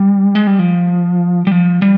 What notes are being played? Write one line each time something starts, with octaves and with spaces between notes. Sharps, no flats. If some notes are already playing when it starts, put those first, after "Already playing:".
Already playing: G3
G#3
G3
F3
G3
F3
G3